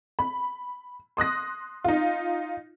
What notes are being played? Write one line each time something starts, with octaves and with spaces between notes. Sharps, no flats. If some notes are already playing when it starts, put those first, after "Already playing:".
B5
C6 D#6 F#6 A#6
D#4 F4